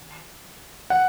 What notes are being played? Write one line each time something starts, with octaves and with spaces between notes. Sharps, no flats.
F#5